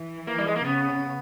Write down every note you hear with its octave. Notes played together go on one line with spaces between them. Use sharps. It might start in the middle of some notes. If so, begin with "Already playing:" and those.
Already playing: E3
A#3
G3
G#3
A#3
C#3 B3